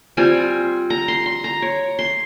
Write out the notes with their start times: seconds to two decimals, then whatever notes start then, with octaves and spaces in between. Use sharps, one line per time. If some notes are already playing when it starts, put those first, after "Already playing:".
0.17 G3 C4 F4 G#5
0.90 A#5
1.08 C6
1.26 C6
1.44 A#5
1.62 C#5
1.99 C6